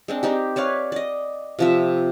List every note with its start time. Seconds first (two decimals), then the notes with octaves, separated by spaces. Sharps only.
0.08 G#3 C4 D4
0.23 C4 D#4 G4
0.56 B4 C#5 D5 F5
0.92 D5 D#5
1.59 C3 F3 E5